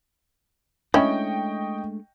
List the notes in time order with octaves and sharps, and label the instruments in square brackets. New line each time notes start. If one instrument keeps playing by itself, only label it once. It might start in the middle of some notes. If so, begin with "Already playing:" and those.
[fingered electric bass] G#3 A3 D4 [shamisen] C#4 E4 [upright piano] D#5 G5 C#6